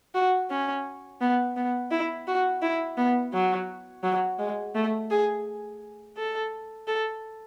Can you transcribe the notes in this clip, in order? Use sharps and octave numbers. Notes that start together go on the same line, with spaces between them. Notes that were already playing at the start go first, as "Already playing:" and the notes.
F#4
C#4
B3
B3
E4
F#4
E4
B3
F#3
F#3
G#3
A3
G#4
A4
A4